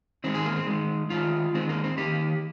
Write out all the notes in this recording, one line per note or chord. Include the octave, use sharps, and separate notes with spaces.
D#3 G#3 C4
G#4
A#3
C4
D#3 G#3
D#3 G#3 F4
D#3 G#3 C4
A#3
C4
D#3 A#3 G4